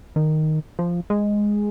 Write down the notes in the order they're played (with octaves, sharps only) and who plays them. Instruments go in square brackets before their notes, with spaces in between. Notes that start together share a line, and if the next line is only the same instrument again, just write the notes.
[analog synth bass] D#3
F3
G#3